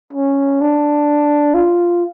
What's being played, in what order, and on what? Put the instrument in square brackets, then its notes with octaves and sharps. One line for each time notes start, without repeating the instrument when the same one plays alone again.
[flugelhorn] C#4
D4
F4